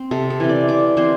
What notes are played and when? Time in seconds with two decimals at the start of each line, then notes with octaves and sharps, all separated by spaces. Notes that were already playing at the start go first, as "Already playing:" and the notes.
Already playing: C4
0.11 C3 A4
0.30 A4
0.40 E3 C4
0.49 D5
0.68 C3 D5
0.97 E3 C4 C5